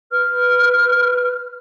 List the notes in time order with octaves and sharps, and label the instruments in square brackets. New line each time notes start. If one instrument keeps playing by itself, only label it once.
[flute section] B4 F6